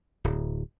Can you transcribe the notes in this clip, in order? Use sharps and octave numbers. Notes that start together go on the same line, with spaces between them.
D1